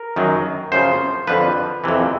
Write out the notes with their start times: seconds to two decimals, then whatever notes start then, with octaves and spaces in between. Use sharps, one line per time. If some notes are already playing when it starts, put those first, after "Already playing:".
Already playing: A#4
0.16 F#2 D#3 F#3
0.72 F#2 C#3 F3 C5
1.27 F2 D3 F3 B4
1.84 F2 C3 E3